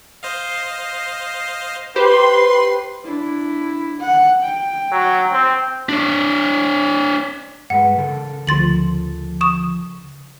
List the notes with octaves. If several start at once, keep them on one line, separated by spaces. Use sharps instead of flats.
C5 D#5 F5
G4 B4 C5 C6
D4 E4
F#5
G5
F#3
C4
D4 C#5
G2 G#3 B4 F#5
C#3 A4 A#4
D2 F3 C6 A6 F#7
C#6 D#6 E7